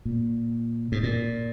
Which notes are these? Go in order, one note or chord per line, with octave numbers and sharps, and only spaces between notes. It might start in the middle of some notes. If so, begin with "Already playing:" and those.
A#2
G#2
A#2